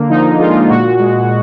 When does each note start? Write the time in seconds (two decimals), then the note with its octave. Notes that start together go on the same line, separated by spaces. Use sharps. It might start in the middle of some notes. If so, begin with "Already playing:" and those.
Already playing: D3 A#3
0.10 F3 D#4
0.40 G#3 F4
0.69 A#2 F#4
1.00 G#3